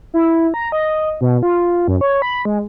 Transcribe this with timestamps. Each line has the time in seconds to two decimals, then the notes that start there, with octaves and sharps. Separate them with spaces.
0.14 E4
0.54 A#5
0.72 D#5
1.21 B2
1.43 F4
1.88 F#2
2.01 C#5
2.22 B5
2.45 G#3